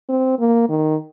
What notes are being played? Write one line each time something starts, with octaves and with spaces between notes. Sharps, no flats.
C4
A#3
D#3